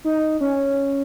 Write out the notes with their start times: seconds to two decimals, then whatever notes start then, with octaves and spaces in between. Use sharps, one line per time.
0.05 D#4
0.41 C#4